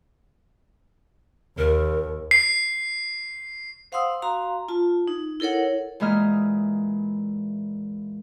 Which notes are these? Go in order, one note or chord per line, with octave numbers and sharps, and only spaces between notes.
D#2 A#4
C7
C5 F5 F#5 C6 D#6 E6
F#4 F5 A#5 C6
F4 A5
D#4
E4 A4 A#4 C#5 F#5
A#2 E3 G#3 E4 D#5 F6